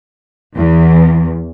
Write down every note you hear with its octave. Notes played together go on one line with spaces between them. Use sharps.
E2